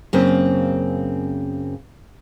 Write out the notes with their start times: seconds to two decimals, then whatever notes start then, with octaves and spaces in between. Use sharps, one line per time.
0.13 F#2 C#3 A#3 C4